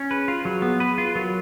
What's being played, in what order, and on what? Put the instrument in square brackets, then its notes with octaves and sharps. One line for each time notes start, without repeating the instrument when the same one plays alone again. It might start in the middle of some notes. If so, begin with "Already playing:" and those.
Already playing: [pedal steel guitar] C#4
[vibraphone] G#4 [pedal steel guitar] B4
[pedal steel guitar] F4
[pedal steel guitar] F#3 [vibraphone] G#4
[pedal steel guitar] B3
B4
F4
[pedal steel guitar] F#3 [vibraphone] A#4